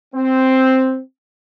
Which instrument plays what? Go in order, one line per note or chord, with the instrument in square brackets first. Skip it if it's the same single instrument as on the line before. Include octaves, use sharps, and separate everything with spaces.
[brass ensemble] C4